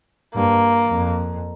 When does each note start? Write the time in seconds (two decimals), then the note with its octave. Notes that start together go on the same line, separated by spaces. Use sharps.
0.35 G2 A#3
0.88 F2